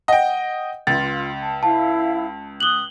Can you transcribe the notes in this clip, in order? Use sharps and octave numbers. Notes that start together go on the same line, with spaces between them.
D#5 F#5 G5
C#2 F4 A6
A5
E4 F5 A5
D6 D#6 F#6 F#7 G7